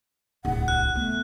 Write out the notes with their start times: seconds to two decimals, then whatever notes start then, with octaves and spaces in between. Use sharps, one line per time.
0.45 D1 C2 F#5
0.68 F#6
0.95 A3 B3